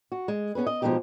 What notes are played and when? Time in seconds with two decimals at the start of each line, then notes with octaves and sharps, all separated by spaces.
0.12 F#4
0.28 G#3
0.55 B3 C#4 G#4 B4
0.67 D#5
0.82 B2 F3 F#3 G#3 D#4 G4